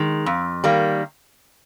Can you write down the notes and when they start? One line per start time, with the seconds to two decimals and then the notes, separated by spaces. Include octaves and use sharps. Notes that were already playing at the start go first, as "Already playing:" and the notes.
Already playing: D#3 G#3
0.26 F2
0.64 D#3 G3 A#3